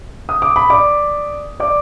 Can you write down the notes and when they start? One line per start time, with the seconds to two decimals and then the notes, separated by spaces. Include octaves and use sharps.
0.29 D#6
0.42 D6
0.56 B5
0.70 D5 D6
1.60 D5 D6